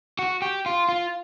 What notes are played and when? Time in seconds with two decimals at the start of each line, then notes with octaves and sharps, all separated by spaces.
0.19 F#4
0.42 G4
0.66 F4
0.89 F4